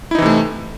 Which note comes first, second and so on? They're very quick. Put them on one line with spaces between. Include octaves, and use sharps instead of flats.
E4 D#4 E3 C3 A3